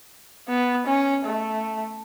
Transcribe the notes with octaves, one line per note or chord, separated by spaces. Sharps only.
B3
C#4
A3